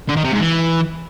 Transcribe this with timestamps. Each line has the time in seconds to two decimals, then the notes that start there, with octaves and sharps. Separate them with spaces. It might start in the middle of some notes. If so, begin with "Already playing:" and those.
0.09 D3
0.16 D#3
0.24 C3
0.32 G#2
0.40 E3